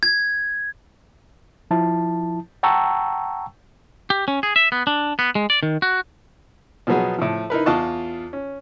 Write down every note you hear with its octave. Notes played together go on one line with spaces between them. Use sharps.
G#6
F3 E4 A5
F#5 G5 A5 A#5 C#6 E6
G4
C#4
G#4
E5
B3
D4
B3
G#3
D5
D#3
F#4
B2 F3 F#3 B3 F#4 G#4
A2 F3
D#4 E4 A#4 B4
E2 F4 D#5 A5 C#6 F#6
C#4